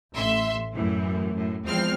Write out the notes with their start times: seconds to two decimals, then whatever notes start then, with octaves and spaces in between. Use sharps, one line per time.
0.15 A1 E5 C6
0.74 F#2 A2 E3
1.31 F#2 A2
1.65 E2 F3 G#3 C4 F6 C7